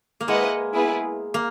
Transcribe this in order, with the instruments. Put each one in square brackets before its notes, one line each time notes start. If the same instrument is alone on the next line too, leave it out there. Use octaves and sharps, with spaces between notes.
[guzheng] A#3
[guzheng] G#3 [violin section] E4 B4 D#5 F#5
[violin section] B3 E4 G#4 B4
[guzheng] A#3